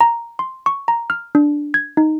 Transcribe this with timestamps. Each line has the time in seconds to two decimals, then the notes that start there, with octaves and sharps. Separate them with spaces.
0.01 A#5
0.39 C6
0.66 C#6
0.88 A#5
1.10 F6
1.35 D4
1.74 G#6
1.97 D#4